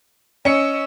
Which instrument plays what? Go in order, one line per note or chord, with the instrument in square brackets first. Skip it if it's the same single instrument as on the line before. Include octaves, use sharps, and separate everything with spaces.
[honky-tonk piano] C#4 C#7 [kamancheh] D#5 E6